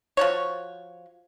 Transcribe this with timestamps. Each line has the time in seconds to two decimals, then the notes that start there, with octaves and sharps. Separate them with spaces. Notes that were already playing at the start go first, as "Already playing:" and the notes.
0.17 F3 F#4 C#5